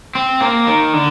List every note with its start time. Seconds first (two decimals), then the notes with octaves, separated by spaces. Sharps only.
0.15 C4
0.41 A#3
0.67 D#3
0.93 D3